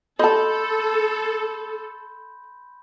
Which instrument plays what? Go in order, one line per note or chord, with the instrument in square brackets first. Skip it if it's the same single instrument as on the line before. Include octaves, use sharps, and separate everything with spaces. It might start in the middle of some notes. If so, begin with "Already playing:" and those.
[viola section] A4 [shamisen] D#5 A5 [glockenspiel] B5 C6 G6